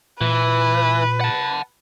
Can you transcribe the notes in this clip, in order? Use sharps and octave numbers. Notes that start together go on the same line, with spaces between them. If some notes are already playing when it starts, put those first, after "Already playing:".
A#2 E3 B4
F#5 A5